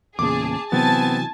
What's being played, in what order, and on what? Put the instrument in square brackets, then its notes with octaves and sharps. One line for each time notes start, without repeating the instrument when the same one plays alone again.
[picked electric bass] E2 A#2 C#3 [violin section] G#4 A5 [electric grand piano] D6
[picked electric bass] C3 E3 F#3 [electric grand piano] B3 C4 [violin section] G#5 A5 A6